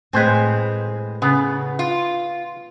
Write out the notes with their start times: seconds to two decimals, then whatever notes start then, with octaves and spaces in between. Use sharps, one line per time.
0.13 A2 G#3 C4 B4 C5 G#5
1.22 C#3 B3
1.79 F4